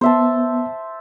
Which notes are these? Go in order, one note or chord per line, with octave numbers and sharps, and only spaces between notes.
B3 C5 E5 A5